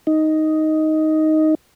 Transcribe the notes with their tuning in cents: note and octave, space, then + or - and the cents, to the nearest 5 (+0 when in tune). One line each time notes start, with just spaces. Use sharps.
D#4 +5